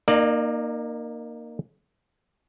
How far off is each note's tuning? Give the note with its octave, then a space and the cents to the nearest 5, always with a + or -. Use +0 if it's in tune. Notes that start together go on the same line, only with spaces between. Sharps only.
A#3 +0 D#4 -25 D5 +20